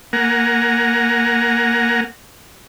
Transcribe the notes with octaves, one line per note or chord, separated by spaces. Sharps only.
A#3 F#5 G#5 A#5